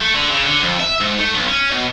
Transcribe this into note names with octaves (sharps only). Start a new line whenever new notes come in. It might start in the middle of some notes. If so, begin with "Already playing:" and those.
A3
D3
C#3
D3
F2
E5
G#2
A3
B1
C#4
B2